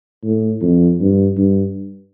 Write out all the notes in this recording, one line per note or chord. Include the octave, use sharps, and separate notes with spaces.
A2
F2
G2
G2